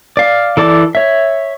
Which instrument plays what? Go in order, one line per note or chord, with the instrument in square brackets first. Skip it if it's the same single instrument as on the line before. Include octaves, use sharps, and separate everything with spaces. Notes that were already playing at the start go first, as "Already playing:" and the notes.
[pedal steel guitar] D5 F5
E3 A4 D5 D6
C#5 E5